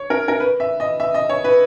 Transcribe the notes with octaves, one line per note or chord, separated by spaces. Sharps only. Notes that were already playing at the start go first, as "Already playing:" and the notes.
Already playing: C#5
A#4
A#4
B4
E5
D#5
E5
D#5
C#5
B4